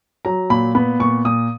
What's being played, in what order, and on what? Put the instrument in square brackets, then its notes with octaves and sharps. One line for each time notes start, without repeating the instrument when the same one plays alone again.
[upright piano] F#3 A#5
A#2 B5
B3 B5
A#2 C#6
A#2 D#6